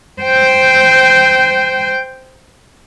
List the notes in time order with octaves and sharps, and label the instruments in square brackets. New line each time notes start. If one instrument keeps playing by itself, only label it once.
[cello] C5 G5